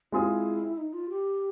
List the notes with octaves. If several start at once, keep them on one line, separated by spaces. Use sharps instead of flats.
G#3 C4 E4 F4 G#4
D#4
F4
G4